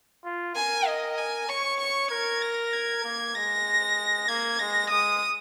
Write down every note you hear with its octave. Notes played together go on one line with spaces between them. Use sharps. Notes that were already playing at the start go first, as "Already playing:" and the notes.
F4
A#4 G#5
D#5
G#5
C#5 C#6
C#6
A#4 G#6
A#6
G#6
A#3
G#3 A#6
A#3 G#6
G#3 A#6
G#3 D#6